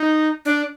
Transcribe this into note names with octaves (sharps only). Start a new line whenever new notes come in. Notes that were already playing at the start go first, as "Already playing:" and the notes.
Already playing: D#4
D4